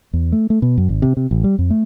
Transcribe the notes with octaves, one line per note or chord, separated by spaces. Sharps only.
E2
A3
A3
B2
F#2
G#1
C3
C3
A1
G3
F2
A3